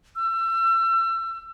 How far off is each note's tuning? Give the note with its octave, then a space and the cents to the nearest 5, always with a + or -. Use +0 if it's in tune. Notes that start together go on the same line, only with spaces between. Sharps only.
E6 +30